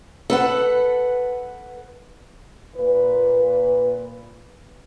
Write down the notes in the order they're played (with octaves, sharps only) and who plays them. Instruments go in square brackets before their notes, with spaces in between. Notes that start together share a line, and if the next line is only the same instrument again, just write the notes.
[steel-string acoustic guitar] A4 B4 F#5
[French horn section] A#2 B4